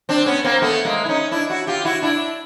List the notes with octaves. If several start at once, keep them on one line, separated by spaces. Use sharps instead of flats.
C4 D4
B3 C#4
A#3 C4
A3 B3
G#3 A#3
E4
C#4 D#4
D4 E4
E4 F#4
F4 G4
E4 F#4
D4 E4